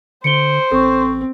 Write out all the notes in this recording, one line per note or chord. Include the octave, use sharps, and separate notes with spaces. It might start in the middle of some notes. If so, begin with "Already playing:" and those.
D3 C5 C#7 D7 G7
A1 C4 A4 C#6